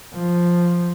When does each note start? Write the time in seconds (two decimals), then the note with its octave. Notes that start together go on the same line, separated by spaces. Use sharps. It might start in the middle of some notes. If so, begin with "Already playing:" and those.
0.15 F3